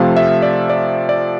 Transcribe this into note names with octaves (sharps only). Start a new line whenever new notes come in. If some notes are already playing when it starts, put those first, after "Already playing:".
Already playing: C3 F3 A3 F5
E5
D5
D5
D5